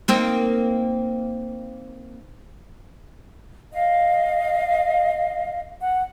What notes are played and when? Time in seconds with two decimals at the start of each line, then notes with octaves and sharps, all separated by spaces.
0.08 A#3 C4 D#4
3.73 D#5 F5
5.81 F#5